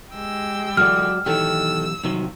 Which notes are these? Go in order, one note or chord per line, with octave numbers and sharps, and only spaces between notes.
G#3 G4 E6
D3 E3 F#3 F4 F#4 D5 F6
B1 D#3 E3 G4 A4 C#5 E6
C2 C3 D#3 F3 F#3